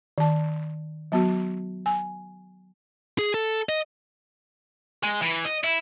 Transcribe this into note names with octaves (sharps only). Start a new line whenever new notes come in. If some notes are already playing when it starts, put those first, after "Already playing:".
D#3 A5
F#3 B3 F#4
G#5
G#4
A4
D#5
G#3
E3
D#5
E4